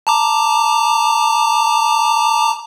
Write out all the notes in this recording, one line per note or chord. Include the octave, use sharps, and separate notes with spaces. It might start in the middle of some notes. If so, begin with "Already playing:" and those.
A5 A#5 D6